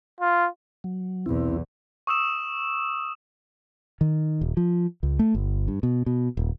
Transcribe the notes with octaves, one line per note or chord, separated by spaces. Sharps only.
F4
F#3
B1 E2 C4 E4
C#6 D#6 E6 E7
D#3
D#1
F3
C#2
A3
G1
G2
B2
B2
D#1